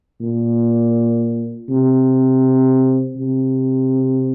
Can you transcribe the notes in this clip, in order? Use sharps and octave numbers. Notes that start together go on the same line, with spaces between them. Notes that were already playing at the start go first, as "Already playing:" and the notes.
A#2
C3
C3